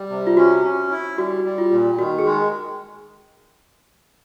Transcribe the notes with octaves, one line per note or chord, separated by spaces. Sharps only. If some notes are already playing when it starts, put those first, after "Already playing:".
Already playing: G3
C3
F4
C#4 F#4
C#4
E4
G3 F#4
G3
F4
A#2
D#3 F#4
G#4
G#3